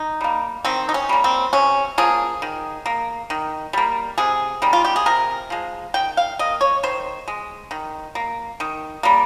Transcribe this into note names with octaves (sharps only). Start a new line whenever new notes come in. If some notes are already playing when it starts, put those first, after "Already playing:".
Already playing: D#4
G3 A#3
D#3 C4
D#4
C#4
G3 A#3
C4
C3 C#4
F3 A#3 G#4
D#3
A#3
D#3
G3 A#3
C3 G#4
D#3 G3 A#3
F4
G4
G#4
C3 A#4
F3 G#3
D#3 G5
F5
A#3 D#5
C#5
D#3 C5
G#3
D#3
A#3
D#3
G3 A#3